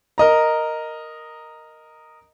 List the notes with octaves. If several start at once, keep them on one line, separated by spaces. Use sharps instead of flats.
A#4 D#5 A#5